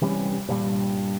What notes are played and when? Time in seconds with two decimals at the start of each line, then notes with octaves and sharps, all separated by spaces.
0.01 C3 E3 G3 C#4
0.49 G2 A#2 G3